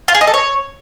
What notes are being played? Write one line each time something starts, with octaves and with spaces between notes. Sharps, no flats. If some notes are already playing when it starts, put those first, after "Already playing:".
F4
G#4
D#5
A4
C#5